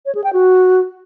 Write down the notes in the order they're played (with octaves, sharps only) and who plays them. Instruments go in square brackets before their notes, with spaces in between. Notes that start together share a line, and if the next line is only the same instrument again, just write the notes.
[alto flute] C#5
G#4
G5
F#4